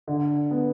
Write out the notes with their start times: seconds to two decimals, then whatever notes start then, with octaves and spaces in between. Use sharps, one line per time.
0.08 D3
0.51 B3